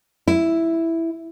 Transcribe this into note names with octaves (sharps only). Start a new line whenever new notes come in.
E4